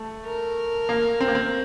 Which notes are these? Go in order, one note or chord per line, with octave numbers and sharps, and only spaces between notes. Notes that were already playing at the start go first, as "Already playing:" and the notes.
Already playing: A3
A#4
A#3
C4
A#3
C4